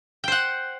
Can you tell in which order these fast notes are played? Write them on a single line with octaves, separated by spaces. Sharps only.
G5 C5 F#5